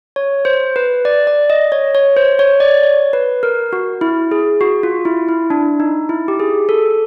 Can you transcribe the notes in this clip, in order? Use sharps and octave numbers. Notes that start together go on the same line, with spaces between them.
C#5
C5
B4
D5
D5
D#5
C#5
C#5
C5
C#5
D5
C#5
B4
A#4
F#4
E4
G#4
F#4
F4
E4
E4
D4
D#4
E4
G4
G#4
A4